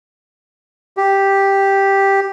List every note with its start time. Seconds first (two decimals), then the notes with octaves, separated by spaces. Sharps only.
0.97 G4